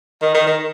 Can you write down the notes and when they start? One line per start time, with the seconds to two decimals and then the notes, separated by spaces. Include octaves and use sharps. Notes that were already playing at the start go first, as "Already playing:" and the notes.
0.22 D#3
0.34 D#3
0.47 D#3